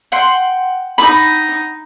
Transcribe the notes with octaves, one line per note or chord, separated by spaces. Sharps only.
F#5 G5 C6
D#4 B5